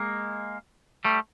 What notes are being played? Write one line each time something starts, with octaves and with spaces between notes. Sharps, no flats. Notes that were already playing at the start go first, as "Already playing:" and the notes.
Already playing: G#3 A#3
G3 A3